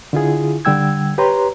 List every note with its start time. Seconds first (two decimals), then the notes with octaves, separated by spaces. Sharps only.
0.13 D3 E4 F4 G#4
0.65 D3 G3 G5 E6 G#6
1.18 G4 B4 C#5 A#5 C6